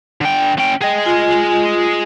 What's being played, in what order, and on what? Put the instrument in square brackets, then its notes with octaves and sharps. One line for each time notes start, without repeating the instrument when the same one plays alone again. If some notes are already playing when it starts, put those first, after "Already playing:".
[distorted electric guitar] D3 G5
C#4 G5
[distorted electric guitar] G#4 D#5 [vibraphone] G5
[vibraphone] F4 G#5